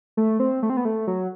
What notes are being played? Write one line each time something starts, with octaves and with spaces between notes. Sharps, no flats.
A3
C4
A3
C4
B3
A3
F#3